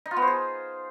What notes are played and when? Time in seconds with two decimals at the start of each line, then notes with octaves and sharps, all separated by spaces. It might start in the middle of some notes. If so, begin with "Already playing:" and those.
0.06 D#4
0.11 F4
0.16 B3
0.22 C5
0.27 G#4